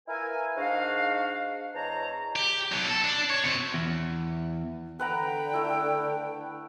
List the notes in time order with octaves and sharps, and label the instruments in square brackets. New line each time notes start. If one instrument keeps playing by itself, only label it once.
[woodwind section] E4 A#4 B4 E5 F5 G#5
G#2 D4 F#4 F5
E2 G#3 C5 C#5 A5 A#5
[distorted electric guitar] G4
B2 F#3
A4
D4
C#5
B2 C4
[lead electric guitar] E2
[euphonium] D3 [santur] B4 F#5 A#5 [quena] G5
[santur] A3 E4